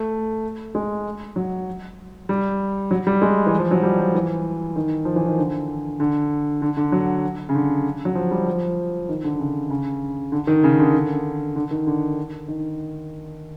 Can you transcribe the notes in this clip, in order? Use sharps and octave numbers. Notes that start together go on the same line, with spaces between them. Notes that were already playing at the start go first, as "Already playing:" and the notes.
Already playing: A3
G#3
F#3
G3
F#3
G3
G#3
E3
F3
F#3
G3
F3
E3
D#3
F3
E3
D#3
D3
D3
D3
D3
F#3
C#3
D3
F#3
F3
G3
F3
D#3
D3
C#3
C#3
D3
D#3
C#3
D3
D3
D3
D#3
D3
D#3